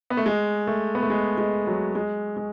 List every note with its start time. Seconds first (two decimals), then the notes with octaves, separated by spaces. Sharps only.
0.10 B3
0.17 A3
0.26 G#3
0.67 A3
0.95 B3
1.03 A3
1.10 G#3
1.38 G#3
1.67 F#3
1.95 G#3
2.37 G#3